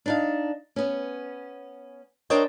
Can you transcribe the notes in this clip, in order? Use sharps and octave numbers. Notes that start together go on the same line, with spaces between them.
D4 D#4 F5
B3 C#4
D4 A#4 C5 C#5 D#5 G5